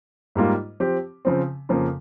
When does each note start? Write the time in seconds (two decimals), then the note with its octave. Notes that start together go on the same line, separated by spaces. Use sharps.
0.35 G#2 G3 A#3 F4
0.80 F3 C4 G4
1.25 C#3 F3 C4
1.69 F2 C#3 F3 A#3